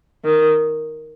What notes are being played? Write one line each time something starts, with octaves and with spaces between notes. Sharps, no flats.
D#3